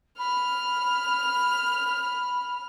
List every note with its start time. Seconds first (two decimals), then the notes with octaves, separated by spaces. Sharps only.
0.18 B5 F6